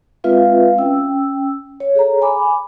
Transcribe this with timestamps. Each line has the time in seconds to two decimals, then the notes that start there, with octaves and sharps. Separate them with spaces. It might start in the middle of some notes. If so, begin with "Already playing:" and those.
0.24 G#3 C4 F4 B4 E5 F5
0.78 C#4 G5 E6
1.80 C#5
1.95 G#4 A4 C#5 A#5
2.22 G#5 B5 D6